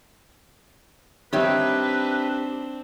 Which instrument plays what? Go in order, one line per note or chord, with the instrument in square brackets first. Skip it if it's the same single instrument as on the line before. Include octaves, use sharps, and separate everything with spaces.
[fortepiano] D#3 G3 [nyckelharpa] C4 D4 [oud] G4 C#5 E5 [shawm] B4